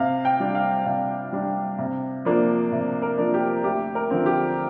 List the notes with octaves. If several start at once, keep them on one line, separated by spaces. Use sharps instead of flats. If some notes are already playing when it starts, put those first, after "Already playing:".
Already playing: C3 F5
G5
G3 D4
F5
C3 F5
G3 D4
C3
F3 A#3 D4
C3
A#4
F3 A#3 D4
G4
D2 G4
A#4
D3 F3 C4
G4